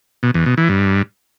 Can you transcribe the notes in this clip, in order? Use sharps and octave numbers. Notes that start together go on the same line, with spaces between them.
B2
E2
B2
E3
G2